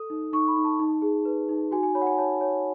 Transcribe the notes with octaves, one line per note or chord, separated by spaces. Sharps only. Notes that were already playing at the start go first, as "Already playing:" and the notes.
Already playing: A4 D#6
D#4
D#4 C#6
B5
D#4
A5
D#4
G#4
B4
D#4
F#4 G#5
G#5
C#5 B5
F#5
G#5
C#5 A5
C#5